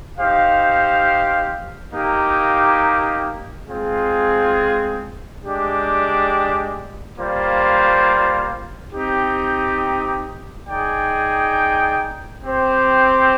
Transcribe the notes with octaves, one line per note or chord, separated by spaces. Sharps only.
D#4 G4 C5 F5
A#3 D#4 G4
G#3 C4 F4 G#4
G#3 D4 G4
G3 A#3 F4 C5
C4 D#4 G4
D#4 G#4 D5 G5
C4 G4 C5